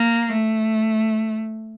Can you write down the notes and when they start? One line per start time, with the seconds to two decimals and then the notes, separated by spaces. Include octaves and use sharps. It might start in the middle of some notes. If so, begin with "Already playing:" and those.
Already playing: A#3
0.32 A3